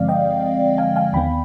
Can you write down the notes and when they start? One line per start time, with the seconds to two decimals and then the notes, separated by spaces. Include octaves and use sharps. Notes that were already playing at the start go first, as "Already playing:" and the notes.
Already playing: G2 D3 F3 G#3 C4 D5 F5
0.08 D#5 G5
0.78 F5 G#5
0.96 F5 G#5
1.13 D#2 D#3 B3 G5 B5